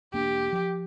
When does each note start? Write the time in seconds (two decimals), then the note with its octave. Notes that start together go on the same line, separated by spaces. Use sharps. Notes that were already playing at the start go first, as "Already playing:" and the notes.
0.14 E1 A#3 D4 G4
0.53 F3